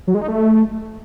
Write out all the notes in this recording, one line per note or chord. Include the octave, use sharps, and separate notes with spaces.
F#3
G#3
D#4
A3